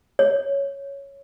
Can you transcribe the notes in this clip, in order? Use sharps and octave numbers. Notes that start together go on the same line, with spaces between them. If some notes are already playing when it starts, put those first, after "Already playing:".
C#5